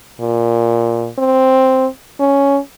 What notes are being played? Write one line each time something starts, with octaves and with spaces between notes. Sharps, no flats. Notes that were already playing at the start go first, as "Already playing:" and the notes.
A#2
C4
C#4